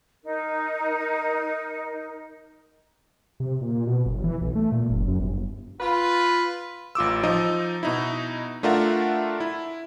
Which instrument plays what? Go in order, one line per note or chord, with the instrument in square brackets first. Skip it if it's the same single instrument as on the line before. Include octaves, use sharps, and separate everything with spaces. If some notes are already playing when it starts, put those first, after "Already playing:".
[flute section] D#4 A#4
[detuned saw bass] C3
A#2
B2
G1
E3
B1
A3
A#2
F#1
F#2
G1
[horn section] F4 B4
[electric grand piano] A1 F4 D6 E6
F3 D#4 D#5
B2 D#4 E4
A3 D4 F4 A#4 E5 F#5
E4